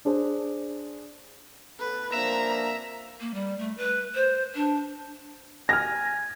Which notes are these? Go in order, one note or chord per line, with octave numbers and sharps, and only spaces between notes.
D4 G#4 C5
A2 B3 A4 B4
F3 A#3 C4 D4 E5 A#5
A#3
G3
A3
B4
C5
D4
G#5 F6 A#6